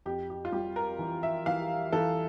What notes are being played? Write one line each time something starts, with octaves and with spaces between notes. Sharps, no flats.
F2 G4
G4
F4
G3 G4
A#4
E3
E5
E3 F5
E3 A4